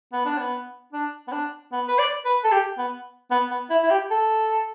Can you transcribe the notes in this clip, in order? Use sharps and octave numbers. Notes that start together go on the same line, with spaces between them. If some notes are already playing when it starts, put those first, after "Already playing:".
B3
D4
B3
D4
B3
D4
B3
B4
D5
B4
A4
G4
B3
B3
B3
E4
E4
G4
A4